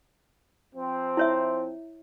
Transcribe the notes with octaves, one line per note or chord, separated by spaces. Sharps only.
F3 C4
E4 C#5 E5